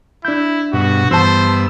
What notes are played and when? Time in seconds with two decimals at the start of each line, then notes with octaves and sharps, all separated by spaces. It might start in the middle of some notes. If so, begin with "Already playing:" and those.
0.25 D4 E4 G6
0.73 G2 B2 F#4
1.11 G2 E3 B3 C5 A5 E6